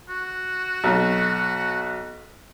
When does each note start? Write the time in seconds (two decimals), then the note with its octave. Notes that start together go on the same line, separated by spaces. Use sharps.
0.09 F#4
0.84 B1